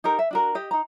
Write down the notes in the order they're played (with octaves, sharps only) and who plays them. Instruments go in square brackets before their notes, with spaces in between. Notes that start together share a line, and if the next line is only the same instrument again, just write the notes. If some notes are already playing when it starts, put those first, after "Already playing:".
[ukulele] D#4 G4 A#4
E5
D4 F#4 A#4
G4 D#5
D#4 A#5